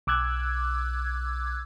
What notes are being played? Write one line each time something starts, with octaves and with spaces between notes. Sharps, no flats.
B1 D6 E6 F#6 G#6